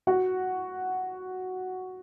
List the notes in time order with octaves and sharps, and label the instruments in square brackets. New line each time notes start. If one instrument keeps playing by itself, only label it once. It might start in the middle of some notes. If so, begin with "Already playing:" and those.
[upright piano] F#4 F#5